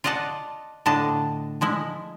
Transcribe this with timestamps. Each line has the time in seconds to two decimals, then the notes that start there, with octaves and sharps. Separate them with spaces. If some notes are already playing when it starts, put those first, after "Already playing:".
0.04 F4 D5 D#5 F#5 A5
0.86 A2 D3 D4 D#5 A5
1.61 F3 G#3 E4